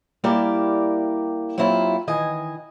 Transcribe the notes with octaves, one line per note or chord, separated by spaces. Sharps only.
G3 A#3 E4 G4 A#4 D5
F#3 A#3 C4 E4 F4 G4
D#3 E3 D#5 G#5